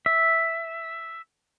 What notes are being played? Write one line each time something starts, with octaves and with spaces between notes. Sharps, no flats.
E5